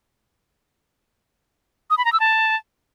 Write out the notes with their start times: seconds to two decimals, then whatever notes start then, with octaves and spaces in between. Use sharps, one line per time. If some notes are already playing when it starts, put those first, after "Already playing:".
1.90 D#6
1.98 B5
2.05 A#5
2.13 E6
2.20 A5